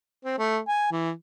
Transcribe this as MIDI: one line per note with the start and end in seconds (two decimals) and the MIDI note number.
0.25 0.37 60
0.38 0.59 57
0.68 0.87 80
0.92 1.10 52